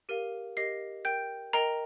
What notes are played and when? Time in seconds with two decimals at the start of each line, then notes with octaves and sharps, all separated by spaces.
0.09 G4 A#4 F5 D#7
0.57 G4 A#4 D#5 C7
1.05 A#4 G5 G6
1.53 A#4 D#5 G5 A#5